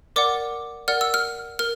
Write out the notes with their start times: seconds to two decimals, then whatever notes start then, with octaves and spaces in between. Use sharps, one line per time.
0.16 A#4 D5 F#5 D6
0.88 A#4 D5 F#5 F6
1.01 E6
1.14 F6
1.59 A#4 F6